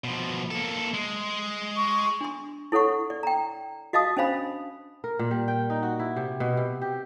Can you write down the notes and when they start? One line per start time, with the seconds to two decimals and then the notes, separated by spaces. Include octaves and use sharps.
0.04 B2 F3
0.51 A#3 A4
0.94 G#3
1.77 C#6
2.21 D4 C6
2.72 E4 A4 C#5 F#5 C#6
3.10 D5
3.23 G5 A#5
3.93 F#4 D#5 F5 A5 D#6
4.17 C#4 D4 C5 F5 B5
5.04 A#4
5.19 A#2
5.31 G3
5.48 G5
5.70 D#4
5.83 F#4
5.99 E4
6.16 C3
6.40 B2
6.57 C3
6.82 G4